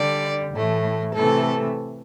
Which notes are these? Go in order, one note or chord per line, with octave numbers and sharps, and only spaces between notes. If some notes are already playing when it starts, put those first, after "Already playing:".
Already playing: D3 G3 D5
A2 E3 A3
C3 E3 A3 A4